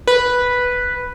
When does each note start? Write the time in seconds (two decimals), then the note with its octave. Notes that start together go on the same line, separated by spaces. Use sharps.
0.07 B4